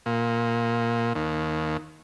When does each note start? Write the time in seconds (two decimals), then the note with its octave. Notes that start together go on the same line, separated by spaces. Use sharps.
0.06 A#2
1.15 D#2